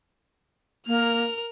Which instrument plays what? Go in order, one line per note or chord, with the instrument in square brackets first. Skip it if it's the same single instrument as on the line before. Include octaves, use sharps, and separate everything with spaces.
[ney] A#3 [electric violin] A#4 F6